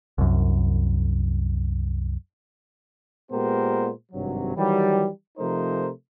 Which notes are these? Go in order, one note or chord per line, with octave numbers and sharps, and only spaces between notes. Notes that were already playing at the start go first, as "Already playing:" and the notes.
C2 F#2
A#2 G#3 B3 G4 A#4 C5
G#1 G2 C3 F#3
D#3 E3 F#3 G3
C3 F3 A3 D#4 A#4 C5